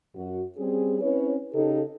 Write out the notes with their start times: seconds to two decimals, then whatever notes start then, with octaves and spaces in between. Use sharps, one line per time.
0.15 F#2 F#4
0.58 G3 C4 C#4 G#4
1.01 C4 C#4 E4 B4 C#5
1.54 C#3 D#4 G4 A4